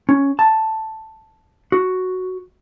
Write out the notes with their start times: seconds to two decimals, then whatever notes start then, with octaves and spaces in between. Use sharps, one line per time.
0.09 C#4
0.39 A5
1.72 F#4